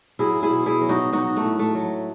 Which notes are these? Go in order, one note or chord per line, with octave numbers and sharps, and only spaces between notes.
F#3 E4 G#4
E4 G#4
B2
E4 G#4
F#3
D#4 F#4
F#3 D#4 F#4
A3
A2
A3
F#3